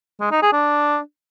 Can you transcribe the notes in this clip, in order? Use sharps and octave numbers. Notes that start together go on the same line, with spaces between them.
G#3
D#4
G#4
D4